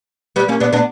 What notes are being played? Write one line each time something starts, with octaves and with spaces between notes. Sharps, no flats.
G3 B3
A#3 C#4
B3 D4
B3 D4